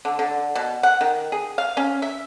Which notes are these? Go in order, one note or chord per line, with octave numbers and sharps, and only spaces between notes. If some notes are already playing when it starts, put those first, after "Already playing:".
D3
D3
B2
F#5
D#3
G#4
F5
C#4
E5